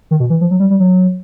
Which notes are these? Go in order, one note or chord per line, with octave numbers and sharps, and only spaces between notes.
D#3
B2
E3
F3
F#3
G3
G3
F#3